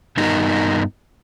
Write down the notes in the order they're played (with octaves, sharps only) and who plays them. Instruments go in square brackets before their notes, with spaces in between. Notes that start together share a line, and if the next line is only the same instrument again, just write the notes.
[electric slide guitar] G2 B3 D#4 A#4